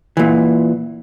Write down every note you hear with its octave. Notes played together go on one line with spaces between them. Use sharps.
A#2 E3